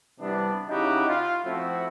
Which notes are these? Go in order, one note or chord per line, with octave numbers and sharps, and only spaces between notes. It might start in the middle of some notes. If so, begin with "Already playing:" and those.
C3 E3 G3 B3 D4
C#3 D#4 E4 F#4 G4
F4
F3 A3 C4 E4 F#4